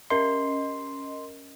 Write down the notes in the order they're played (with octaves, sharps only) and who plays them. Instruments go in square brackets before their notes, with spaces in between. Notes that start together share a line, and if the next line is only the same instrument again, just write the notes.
[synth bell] C#4 A#4 D#5 [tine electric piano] C6